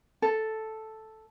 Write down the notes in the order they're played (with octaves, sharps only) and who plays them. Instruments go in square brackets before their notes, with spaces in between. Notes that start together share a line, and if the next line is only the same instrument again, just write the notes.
[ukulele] A4